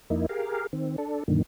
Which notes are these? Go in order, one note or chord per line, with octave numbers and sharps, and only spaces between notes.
F2 A#3 D#4 E4
G4 G#4 A#4 F5
D#3 C4
D4 A4
F#2 A#2 D3 D#3